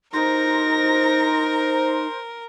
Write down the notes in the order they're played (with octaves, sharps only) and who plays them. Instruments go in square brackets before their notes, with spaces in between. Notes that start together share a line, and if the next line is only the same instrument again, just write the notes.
[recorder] D#4 [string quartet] A#4 [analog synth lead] C5 [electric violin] A#6